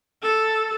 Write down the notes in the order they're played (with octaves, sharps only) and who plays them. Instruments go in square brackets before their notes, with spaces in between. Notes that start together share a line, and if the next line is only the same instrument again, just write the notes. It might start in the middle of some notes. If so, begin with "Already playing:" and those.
[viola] A4